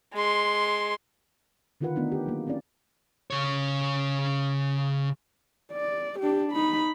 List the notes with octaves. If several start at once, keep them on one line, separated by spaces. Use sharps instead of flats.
G#3 C6
D3 D#3 F4 A#4 B4 F#5
D#3 A3 B3 D4 D#4
G4
F#3 A#3
C4 C#4 E4 D5
C#3 C#5
D5
D4 G4
D#4 B5